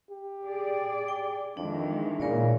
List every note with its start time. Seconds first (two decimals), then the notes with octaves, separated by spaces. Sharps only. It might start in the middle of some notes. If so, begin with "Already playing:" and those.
0.10 G4
0.47 G#4 D5
1.08 G5
1.57 F2 D#3 E3 G#3 D4
2.20 A#2 C#3 A#4 C#5 D5